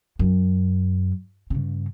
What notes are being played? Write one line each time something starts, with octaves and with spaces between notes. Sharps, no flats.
F#2
G2 C#3